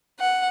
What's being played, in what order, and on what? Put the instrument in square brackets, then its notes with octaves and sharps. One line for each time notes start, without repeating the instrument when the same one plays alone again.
[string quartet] F#5